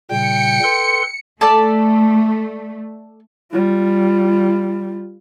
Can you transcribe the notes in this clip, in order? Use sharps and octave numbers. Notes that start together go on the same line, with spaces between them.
A#2 C#3 G3 G5 C#7
A4 B4 C6
A3 A4 D5 A5
G3 F4